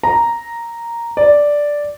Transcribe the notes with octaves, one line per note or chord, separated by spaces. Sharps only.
A#5
D5